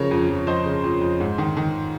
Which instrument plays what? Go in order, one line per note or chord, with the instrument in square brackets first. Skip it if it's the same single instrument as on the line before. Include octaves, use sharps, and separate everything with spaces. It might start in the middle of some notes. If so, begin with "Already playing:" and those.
Already playing: [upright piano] C#3 F3 A#4 C#5
F2
F2
F3 C5 D#5
C#3
F2
F2
G#2
D#3
D#3